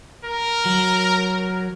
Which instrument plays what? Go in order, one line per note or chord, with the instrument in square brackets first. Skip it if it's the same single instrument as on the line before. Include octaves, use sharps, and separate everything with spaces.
[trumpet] A#4
[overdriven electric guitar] F#3